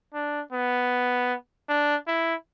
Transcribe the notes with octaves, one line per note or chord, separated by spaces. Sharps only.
D4
B3
D4
E4